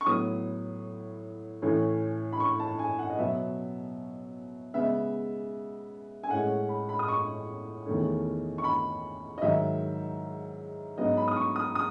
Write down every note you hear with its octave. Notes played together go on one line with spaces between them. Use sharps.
C#6
A2 F#3 B3 D#6
A2 E3 A3 C#4
B5
C#6
A5
G#5
F#5
D#5
B2 F#3 B3 E5
C#3 G#3 B3 E5
G#5
A2 G#3 C#4 F#5
B5
B5
D#6
C#6
E2 D#3 A3 C#4
C#6
B5
D#5
G#2 D#3 F#3 E5
G#2 F#3 B3 D#5
B5
D#6
C#6
D#6
D#6